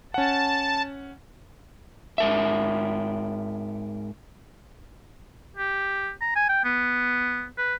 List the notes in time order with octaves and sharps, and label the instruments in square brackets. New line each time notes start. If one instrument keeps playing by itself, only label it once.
[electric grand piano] C#4 F#5 [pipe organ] A5
[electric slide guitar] G#2 A#4 E5
[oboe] G4
A#5
G#5
G5
B3
B4